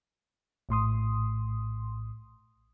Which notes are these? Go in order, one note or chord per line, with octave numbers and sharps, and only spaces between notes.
A#1 A2 C6 D#6